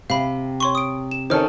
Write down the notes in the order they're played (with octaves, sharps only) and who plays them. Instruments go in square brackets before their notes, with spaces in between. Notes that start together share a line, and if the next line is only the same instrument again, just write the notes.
[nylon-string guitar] C3 [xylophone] F5 B5
[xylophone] C#5 C6 C#6
D#6 D7
E7
[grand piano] D#3 C#4 A4 [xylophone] C5 F6